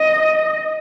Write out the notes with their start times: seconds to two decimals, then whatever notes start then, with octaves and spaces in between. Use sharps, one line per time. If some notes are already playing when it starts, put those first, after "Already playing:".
Already playing: D#5